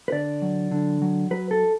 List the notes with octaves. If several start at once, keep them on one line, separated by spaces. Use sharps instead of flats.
B4
D3 D5
F#3
D3
F#3
F#3 B4
A4